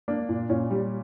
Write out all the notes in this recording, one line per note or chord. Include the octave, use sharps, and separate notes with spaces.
A#3 D4
A#2
A#2 C#4
G3